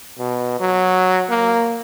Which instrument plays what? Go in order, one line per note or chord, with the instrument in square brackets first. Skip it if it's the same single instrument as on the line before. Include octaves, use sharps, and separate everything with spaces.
[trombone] B2
F#3
A#3